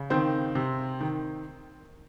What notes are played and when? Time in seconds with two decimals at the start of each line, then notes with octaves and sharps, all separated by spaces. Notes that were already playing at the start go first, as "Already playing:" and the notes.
Already playing: C#3
0.10 D#3 C4
0.55 C3
1.01 D#3